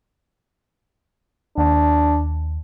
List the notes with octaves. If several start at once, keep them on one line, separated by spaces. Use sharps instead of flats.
D#2 D4